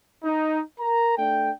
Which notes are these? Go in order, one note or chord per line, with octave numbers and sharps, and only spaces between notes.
D#4
A#4 A#5
A3 D4 G5